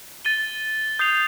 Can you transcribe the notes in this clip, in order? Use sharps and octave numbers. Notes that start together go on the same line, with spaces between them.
A6 D#7 G7
D#6 G6 C7 F7